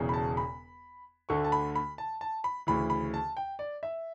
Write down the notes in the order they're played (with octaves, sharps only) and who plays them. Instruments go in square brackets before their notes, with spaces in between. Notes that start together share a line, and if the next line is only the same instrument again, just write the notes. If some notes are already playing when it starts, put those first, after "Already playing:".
Already playing: [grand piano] E1 E2 C#3
B5
A5
B5
D2 D3 A3 C#6
A5
B5
B5
A5
A5
B5
D2 C#3 E3 B5
B5
A5
G5
D5
E5